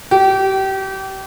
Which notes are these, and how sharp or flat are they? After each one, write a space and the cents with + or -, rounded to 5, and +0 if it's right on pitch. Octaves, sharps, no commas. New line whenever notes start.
G4 -30